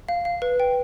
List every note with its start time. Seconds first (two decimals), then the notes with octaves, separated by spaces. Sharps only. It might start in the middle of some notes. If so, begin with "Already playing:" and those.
0.09 F5
0.25 F5
0.42 B4
0.60 G5